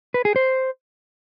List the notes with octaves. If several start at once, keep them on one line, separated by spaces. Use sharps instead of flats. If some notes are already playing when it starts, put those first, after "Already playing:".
B4
G#4
C5